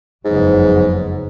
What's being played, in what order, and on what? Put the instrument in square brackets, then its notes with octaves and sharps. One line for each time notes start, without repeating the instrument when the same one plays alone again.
[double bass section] F#1 F2 C#3 F#3 B3 [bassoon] G#2